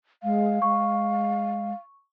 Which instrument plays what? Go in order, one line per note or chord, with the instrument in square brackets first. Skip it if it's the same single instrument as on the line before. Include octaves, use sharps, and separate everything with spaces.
[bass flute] G#3 [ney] F5
[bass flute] G#3 [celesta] C#6